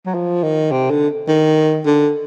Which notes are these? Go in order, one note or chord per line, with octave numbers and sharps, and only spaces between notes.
F#3
F3
D#3
C3
D3
D#3
D3